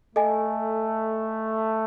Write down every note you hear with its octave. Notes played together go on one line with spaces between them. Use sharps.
A3 A4 D#5 G#5